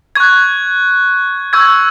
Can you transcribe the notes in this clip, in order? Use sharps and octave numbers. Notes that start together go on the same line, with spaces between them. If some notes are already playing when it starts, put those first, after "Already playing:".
C#6 F#6 G#6
C#6 E6 G6 G#6